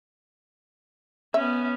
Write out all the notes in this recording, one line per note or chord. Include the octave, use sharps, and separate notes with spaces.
B3 C#4 E5